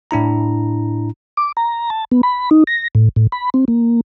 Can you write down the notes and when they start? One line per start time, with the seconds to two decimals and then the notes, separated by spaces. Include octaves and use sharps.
0.11 A2 D4 E4 A#5
1.37 D6
1.57 A#5
1.90 A5
2.11 B3
2.23 B5
2.51 D#4
2.67 A#6
2.95 A2
3.16 A2
3.32 B5
3.54 C4
3.68 A#3